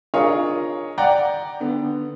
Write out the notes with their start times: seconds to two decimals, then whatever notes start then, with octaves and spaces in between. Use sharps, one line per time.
0.14 D4 F4 G#4 A#4 C#5 D#5
0.98 D5 F#5 G5 A#5
1.60 D3 B3